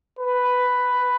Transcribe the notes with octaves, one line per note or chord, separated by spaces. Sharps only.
B4